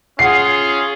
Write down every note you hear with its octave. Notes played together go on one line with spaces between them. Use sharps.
C#4 F4 G#4 F#5 C7